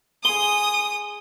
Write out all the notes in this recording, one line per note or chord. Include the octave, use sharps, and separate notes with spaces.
G#4 C6 D#6 G7